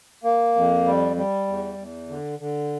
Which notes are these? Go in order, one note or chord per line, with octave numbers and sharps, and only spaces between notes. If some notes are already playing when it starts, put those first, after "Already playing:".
A#3
F2
G3
G3
E2
E2
D3
D3